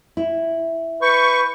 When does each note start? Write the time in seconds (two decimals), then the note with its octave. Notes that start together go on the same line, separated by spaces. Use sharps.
0.17 E4
1.02 B4 C#6 G6